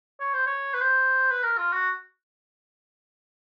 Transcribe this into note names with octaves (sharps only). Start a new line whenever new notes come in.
C#5
C5
C#5
B4
C5
B4
A#4
F4
F#4